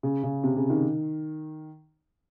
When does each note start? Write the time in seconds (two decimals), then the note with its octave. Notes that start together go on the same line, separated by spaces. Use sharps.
0.03 C#3
0.23 C#3
0.44 C3
0.56 C#3
0.70 D#3